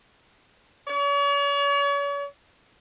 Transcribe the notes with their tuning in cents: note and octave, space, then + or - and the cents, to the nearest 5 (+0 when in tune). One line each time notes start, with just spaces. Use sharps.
C#5 +40